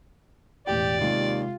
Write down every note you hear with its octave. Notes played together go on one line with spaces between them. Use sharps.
E1 A1 G4 D5 G5
D#2 C3 G#3 F4